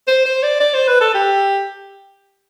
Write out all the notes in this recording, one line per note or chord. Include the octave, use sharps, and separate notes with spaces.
C5
C5
D5
D5
C5
B4
A4
G4